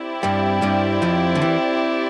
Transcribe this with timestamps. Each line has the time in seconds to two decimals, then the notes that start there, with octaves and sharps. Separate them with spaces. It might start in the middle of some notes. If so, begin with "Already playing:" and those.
Already playing: C4 E4 G4 D5
0.23 G2 G3
0.62 G2 G3
1.02 F2 F3
1.35 D3
1.42 E3